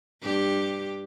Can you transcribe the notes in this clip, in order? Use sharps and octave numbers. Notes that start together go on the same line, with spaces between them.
G2 G4